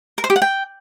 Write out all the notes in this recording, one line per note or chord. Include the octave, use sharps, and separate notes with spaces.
A#4
C5
G4
F#5
G5